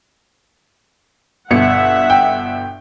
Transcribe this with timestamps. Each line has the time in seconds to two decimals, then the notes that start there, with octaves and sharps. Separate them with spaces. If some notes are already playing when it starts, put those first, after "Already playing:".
1.51 G1 B2 E5 F#5 C#7
2.10 G5